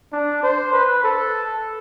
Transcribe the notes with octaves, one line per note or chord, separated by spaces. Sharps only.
D4
C5
B4
A4